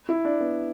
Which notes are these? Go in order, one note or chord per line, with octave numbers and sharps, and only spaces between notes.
E4
D4
B3